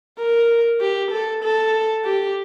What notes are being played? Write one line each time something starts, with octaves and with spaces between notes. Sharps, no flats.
A#4
G4
A4
A4
G4